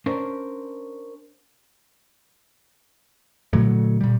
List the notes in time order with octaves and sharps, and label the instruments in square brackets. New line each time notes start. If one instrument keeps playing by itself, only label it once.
[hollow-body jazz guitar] C#4 D4 A#4 C5
[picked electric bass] A#2 D3 F#3 A3
A#2 G3